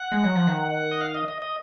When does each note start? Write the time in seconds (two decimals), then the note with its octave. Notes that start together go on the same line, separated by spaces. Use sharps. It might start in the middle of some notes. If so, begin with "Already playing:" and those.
Already playing: F#5
0.12 G#3
0.24 F#3
0.35 F3
0.47 D#3
0.91 D#5
1.01 F5
1.14 D#5
1.28 D#5
1.42 D#5